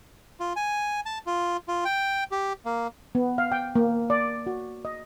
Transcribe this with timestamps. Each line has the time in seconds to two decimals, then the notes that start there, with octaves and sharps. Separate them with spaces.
0.40 F4
0.56 G#5
1.06 A5
1.26 F4
1.68 F4
1.85 G5
2.31 G4
2.65 A#3
3.15 B3
3.38 F5
3.52 G5
3.76 A#3
4.10 D5
4.47 F#4
4.85 D#5